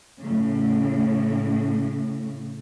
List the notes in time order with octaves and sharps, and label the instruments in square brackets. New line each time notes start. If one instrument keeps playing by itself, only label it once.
[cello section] A2 C#3